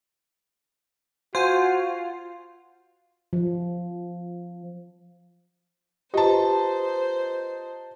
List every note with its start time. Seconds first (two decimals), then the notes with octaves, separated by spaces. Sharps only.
1.35 F4 F#4 C5 G#5
3.33 F3
6.14 F4 G4 B4 C5 D#5 A5 A#5